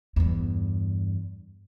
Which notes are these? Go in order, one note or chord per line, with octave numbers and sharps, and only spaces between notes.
E2 G2